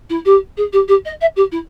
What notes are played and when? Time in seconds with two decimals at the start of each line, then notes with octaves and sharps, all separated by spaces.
0.09 E4
0.25 G4
0.57 G#4
0.72 G4
0.88 G4
1.05 D#5
1.21 E5
1.36 G4
1.51 E4